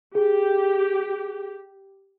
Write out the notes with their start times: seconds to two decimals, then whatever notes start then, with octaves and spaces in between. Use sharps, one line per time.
0.15 G4 G#4